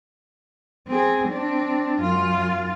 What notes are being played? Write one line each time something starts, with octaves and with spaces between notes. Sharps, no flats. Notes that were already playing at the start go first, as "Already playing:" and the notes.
C4 G#4
C4 D4
F#2 F4